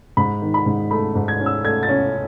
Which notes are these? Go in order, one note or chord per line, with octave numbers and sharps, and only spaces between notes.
G#2 B5
D#3
B5
G#2
A3 B5
G#2
G#6
C#4
E6
A3 G#6
A6
C#4